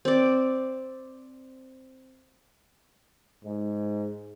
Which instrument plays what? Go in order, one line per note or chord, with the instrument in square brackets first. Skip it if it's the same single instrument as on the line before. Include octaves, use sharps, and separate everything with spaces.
[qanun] C4 D5
[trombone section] G#2